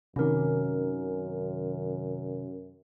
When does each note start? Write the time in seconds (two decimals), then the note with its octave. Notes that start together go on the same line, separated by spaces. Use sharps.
0.16 F#2 C3 D#3 C#4 A#4